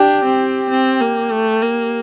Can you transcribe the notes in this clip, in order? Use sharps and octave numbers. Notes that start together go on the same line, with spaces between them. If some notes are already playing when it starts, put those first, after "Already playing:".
Already playing: D4 G4
C4
C4
A#3
A3
A#3